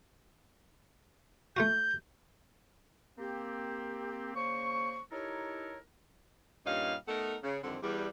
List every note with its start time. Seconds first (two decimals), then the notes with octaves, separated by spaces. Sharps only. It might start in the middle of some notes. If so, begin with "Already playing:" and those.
1.57 A3 F4 F#4 G6
3.18 A#3 C4 G4
4.36 C#3 A#3 C5 C#6
5.12 D#4 E4 G4 A4 A#4 C#5
6.65 G2 A#2 G3 C#4 D#4 F5
7.07 A3 B3 D#4 A4 A#4
7.43 C#3
7.63 F2 D3 D#3 G3 C4
7.82 E2 G3